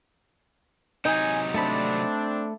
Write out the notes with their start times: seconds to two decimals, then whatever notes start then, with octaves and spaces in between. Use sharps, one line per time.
1.05 C3 F#3 D#4 G#5
1.54 A3 C4 D4 A5 B5